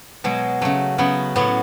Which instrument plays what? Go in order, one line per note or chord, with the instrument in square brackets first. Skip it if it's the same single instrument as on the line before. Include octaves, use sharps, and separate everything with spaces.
[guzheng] B2 F#3 G#3
C#3 F#3 A3
C#3 F#3 B3
A2 F#3 B3